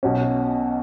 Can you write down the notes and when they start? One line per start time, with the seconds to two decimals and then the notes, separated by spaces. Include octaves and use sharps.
0.03 B1 B2 F#3 C#4